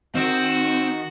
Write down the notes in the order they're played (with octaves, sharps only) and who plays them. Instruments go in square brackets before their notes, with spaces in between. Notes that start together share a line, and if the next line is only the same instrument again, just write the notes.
[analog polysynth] D#3 [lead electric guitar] C4 [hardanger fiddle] F#4